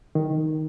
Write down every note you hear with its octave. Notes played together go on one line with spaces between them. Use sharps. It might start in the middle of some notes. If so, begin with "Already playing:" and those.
D#3